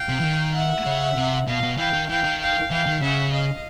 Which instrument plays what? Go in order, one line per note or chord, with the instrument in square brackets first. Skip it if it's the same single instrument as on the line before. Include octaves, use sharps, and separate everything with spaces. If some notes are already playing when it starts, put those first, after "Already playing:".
Already playing: [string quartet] F5 G5
[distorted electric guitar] C3
E3
D#3
[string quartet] E5 F#5
[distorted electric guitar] C#3
C3
[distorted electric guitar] B2 [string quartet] D#5 F5
[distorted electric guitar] B2
[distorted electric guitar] E3 [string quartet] F5 G5
[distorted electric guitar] D#3
[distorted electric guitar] E3 [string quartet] F5 G5
[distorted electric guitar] D#3
[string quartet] F5 G5
[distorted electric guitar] E3 [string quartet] F5 G5
[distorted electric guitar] D#3
[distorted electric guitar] C#3 [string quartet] E5 F#5
[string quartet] D#5 F5